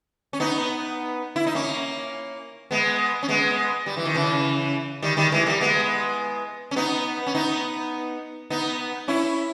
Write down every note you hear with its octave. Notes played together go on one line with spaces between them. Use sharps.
C#4
B3 D#4
E4
D#4
A#3 C#4
G#3 B3
C#4
G#3 B3
G3
E3
D#3
C#3 E3
D#3 G3
D#3 G3
E3 G#3
G3 A#3
G#3 B3
C#4
B3 D#4
C#4
B3 D#4
B3 D#4
C#4 E4